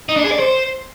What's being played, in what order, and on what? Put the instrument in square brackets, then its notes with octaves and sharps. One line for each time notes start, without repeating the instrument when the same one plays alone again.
[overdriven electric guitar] D#4
D4
G#4
D5
C5